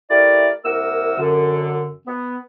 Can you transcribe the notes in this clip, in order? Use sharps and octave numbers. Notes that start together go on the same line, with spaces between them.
A3 E4 G4 A#4 D5
C2 A#3 E4 A#4 F#5 E6
F#2 D3
B3